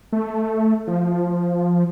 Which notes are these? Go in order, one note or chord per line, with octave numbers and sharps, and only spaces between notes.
A3
F3